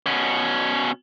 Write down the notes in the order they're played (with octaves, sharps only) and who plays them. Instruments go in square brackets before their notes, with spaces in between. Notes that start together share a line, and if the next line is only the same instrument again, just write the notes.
[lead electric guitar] B2 C#4